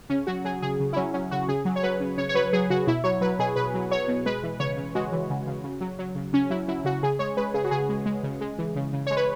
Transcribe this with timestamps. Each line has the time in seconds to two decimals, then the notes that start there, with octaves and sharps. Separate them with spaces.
0.09 C#3 C#4
0.27 F#3 F#4
0.44 F#3 G#4
0.62 C#3 G#4
0.80 C#3
0.93 E4
0.96 F#3 C#4
1.14 F#3 C#4
1.31 C#3 F#4
1.48 C#3 G#4
1.65 F#3
1.76 C#5
1.83 F#3 B4
2.00 C#3
2.17 C#3 C#5
2.29 C#5
2.34 F#3 B4
2.53 F#3 G#4
2.70 C#3 F#4
2.87 B2 E4
3.04 F#3 C#5
3.21 F#3 B4
3.39 B2 G#4
3.56 B2 B4
3.74 F#3
3.90 F#3 C#5
4.08 B2
4.26 G#3 B4
4.43 E3
4.60 C#3 C#5
4.77 C#3
4.95 G#3 F#4
5.12 E3
5.30 C#3
5.47 C#3
5.64 C#3
5.81 F#3
5.99 F#3
6.15 C#3
6.33 C#3 C#4
6.50 F#3 E4
6.68 F#3 E4
6.85 C#3 F#4
7.03 C#3 G#4
7.19 G#3 C#5
7.37 G#3 B4
7.54 C#3 G#4
7.64 F#4
7.71 C#3 G#4
7.89 G#3
8.06 G#3
8.23 C#3
8.41 G#3
8.58 E3
8.76 C#3
8.93 C#3
9.07 G#3 C#5
9.17 B4